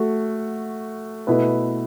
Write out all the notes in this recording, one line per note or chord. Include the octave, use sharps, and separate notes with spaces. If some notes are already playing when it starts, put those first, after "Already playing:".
Already playing: A3 F#4
B2 A3 E4 B4